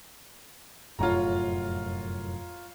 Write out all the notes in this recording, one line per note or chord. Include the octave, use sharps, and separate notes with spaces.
F1 F#2 A2 F4 C#5 A#5